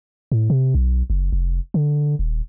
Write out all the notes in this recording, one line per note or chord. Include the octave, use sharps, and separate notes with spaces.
A2
C3
B1
F#1
F1
D3
D#1